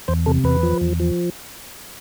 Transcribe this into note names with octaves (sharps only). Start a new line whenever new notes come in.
E2 C5
C3 A4
E2 B4
F3
E2
F3